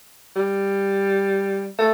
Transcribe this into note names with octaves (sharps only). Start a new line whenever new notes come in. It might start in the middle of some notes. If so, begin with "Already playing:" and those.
G3
A3